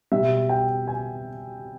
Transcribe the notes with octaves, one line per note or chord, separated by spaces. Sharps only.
B2 G3 E5
G5
G#5